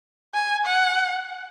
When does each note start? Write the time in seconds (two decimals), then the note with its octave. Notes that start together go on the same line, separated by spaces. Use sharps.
0.34 G#5
0.65 F#5